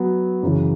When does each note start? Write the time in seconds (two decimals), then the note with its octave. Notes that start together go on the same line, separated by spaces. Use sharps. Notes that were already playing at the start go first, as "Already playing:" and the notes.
Already playing: F#3 B3
0.43 F#2 C#3 E3